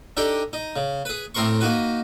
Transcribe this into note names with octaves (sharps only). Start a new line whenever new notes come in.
D4 D#4 G4 A4
D#4
C#3
G#4 B4
A2 C4 A#4 C6 C#6
A#3 D#4 F#4 B4